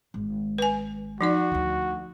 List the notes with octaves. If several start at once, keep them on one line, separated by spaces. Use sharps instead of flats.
G#1
B4 G#5
F3 D#4 F#4 D5
D2 D3